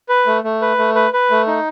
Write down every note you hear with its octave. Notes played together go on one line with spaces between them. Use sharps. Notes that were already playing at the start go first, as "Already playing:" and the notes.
B4
A3
A3
B4
A3
B4
B4
A3
D#4